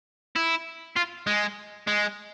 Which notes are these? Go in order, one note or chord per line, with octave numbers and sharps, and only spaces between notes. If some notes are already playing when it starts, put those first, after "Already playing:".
E4
F4
G#3
G#3